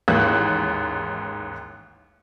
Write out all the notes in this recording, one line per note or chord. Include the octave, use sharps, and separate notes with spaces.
A1 D#2 G#2 F#6